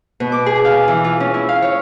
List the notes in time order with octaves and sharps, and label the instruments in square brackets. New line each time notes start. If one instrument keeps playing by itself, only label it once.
[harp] B2
D6
G#4
F5
E3
F4
C#4
E4
F5
C#5